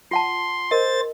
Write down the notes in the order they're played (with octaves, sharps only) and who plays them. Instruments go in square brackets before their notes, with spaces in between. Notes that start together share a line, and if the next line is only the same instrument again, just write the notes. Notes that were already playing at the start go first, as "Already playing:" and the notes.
[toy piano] F4 F#5 A5 [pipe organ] C6
[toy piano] A#4 D#5 [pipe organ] C5 A6